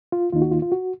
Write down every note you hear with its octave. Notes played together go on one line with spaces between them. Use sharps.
F4
D#2 D#3 A#3 D#4 F4
F#4
F4
F4
F#4